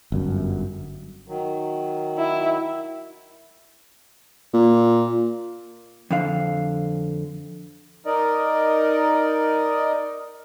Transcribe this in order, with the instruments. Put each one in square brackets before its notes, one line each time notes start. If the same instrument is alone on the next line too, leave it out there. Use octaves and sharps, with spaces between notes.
[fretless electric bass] G1 F#2
[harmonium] D#3 F#3
[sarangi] E4
[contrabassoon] A#2
[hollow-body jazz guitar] F2 D3 F5
[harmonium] D#4 A#4 D5 D#5